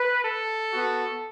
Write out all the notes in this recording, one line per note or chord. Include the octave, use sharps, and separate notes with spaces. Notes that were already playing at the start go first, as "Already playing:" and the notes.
Already playing: B4
A4
B3 F#4